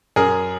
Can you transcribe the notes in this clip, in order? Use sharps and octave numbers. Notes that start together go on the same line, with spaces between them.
F#2 G#4 A#4